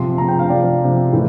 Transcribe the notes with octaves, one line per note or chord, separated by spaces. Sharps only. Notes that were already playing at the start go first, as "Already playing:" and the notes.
Already playing: C3 F3 C6
C3 F3 A#5
G5
F5
C3 F3 D5
C3 F3
A2 E3